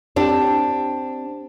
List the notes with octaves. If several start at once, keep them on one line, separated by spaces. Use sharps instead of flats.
C4 D4 G4